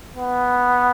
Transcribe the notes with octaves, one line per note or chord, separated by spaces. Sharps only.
B3